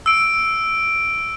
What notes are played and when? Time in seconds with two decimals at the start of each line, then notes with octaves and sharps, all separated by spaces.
0.06 E6 D7